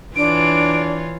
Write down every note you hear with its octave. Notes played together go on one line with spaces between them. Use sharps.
E3 D4 F4 C#5 D7